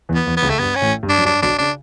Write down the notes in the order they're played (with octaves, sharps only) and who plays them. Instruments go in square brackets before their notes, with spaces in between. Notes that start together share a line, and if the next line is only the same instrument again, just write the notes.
[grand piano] E2 E3
[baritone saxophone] B3
[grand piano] E2 E3
[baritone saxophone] B3
[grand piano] C#2 C#3
[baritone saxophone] A3
[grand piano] G2 [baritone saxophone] B3
[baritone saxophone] C#4
[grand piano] A1 A2
G2
[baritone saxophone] D4
[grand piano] F#2
[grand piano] G2 [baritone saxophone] D4
[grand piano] B1 B2 [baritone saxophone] D4
[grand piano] C#3 [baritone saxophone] D4